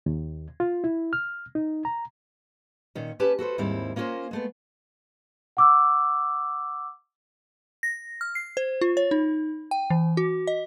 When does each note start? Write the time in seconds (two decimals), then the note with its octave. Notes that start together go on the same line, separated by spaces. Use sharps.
0.06 D#2
0.60 F4
0.84 E4
1.13 F6
1.55 D#4
1.85 A#5
2.95 A#2 D#3 C#4
3.20 C#4 G4 B4 A5
3.39 F#4 A4 B4 C5
3.58 D#2 G#2 G3 C4 E4
3.96 A#3 C#4 F4 G#4 A#4 C5
4.31 G#3 A3 B3
5.57 F#5 D6 E6
7.83 A#6
8.21 F6
8.35 C7
8.57 C5
8.81 F4
8.97 C#5
9.11 D#4
9.71 G5
9.90 E3
10.17 F#4
10.47 D#5